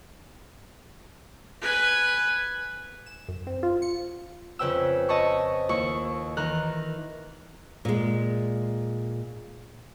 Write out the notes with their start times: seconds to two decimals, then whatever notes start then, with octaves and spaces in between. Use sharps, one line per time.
1.61 B4 G#5
3.06 E7
3.28 F#2
3.47 C4
3.63 F4
3.82 C#7
4.59 F2 C#3 B4 G5 E6
5.09 D#5 A5 B5 C#6
5.69 D#2 E4 C#6
6.37 D#3 E3 A#4 F#6
7.85 A#2 G#3